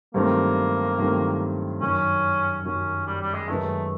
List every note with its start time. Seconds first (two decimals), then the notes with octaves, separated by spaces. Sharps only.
0.14 G2 D#3 F#3 A3 A#3 C4
0.98 G2 D#3 F#3 A3 C4
1.81 F#2 D#3 F#3 C#4
2.64 F#2 D#3 F#3 C#4
3.07 G3
3.21 G3
3.34 G#3
3.48 F#2 D#3 G#3 A3 B3 D#4